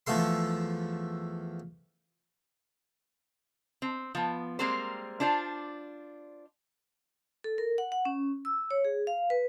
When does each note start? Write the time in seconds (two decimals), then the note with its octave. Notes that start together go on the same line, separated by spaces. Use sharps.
0.07 E2 F3 A3 A4 C6
3.82 C4
4.15 F3 B3
4.59 G3 G#3 A#3 C4 A#4 C5
5.20 D4 F4 C5 D5
7.44 A4
7.58 A#4
7.78 F#5
7.92 F#5
8.05 C#4
8.45 E6
8.71 C#5
8.85 G#4
9.07 F5
9.30 B4